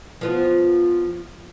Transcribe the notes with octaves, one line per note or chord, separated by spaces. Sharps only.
F3 B3 F4